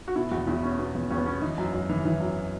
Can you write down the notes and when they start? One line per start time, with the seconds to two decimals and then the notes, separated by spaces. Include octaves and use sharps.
0.08 F#4
0.16 B2 E4
0.31 E2 F#4
0.47 E2 E4
0.63 B2 C#4
0.79 B2 B3
0.95 E2
1.10 E2 C#4
1.18 B3
1.25 B2 C#4
1.42 E3 D#4
1.58 F#2
1.73 F#2
1.90 E3
2.05 E3
2.21 F#2